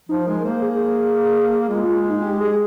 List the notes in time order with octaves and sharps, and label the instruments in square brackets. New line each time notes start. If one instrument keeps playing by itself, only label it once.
[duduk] F3 [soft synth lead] D#4
[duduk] G#3 [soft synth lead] A#4
[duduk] A#3 [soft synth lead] C5
[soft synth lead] G#4
[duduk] G#3 [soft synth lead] F4
[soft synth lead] F4
D#4
G4
G#4